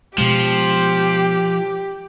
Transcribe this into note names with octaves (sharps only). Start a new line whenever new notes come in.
B2 F3 G#3 G4